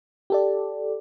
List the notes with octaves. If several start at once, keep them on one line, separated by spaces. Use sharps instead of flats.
G4 A4 D5